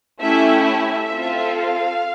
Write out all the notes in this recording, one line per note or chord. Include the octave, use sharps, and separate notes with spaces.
A3 C#4 E4 G4 E5
E5
C4 F4 A4
F5